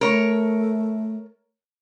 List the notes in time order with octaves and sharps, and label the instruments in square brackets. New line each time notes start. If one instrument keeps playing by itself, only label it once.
[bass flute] A3 [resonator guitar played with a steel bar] A#4 C#5